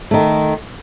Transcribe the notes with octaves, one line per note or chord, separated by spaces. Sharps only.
D#3 A3